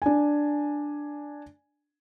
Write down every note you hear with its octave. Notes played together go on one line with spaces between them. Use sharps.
D4 G#5